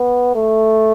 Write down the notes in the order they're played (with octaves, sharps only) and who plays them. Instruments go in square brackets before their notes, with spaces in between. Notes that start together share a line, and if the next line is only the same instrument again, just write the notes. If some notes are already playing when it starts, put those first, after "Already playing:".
Already playing: [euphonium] B3
A3